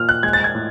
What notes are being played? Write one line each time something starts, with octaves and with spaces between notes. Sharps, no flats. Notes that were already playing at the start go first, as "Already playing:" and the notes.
Already playing: A#2 F6
F#6
G#3 G#6
A6
G#6
A2